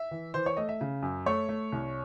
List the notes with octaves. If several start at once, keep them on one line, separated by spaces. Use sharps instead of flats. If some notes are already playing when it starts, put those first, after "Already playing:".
Already playing: E5
E3
E3 C5
C#5
A3 D#5
E5
C#3
F#2
A3 C#5
A3
C2